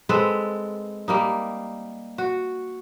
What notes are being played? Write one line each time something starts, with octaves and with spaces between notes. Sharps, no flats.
G#3 C4 A4 B4
G3 A#3 D#4
F#4